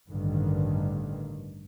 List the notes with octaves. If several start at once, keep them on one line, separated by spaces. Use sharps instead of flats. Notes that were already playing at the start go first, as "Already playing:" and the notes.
A1 G2 D3 D#3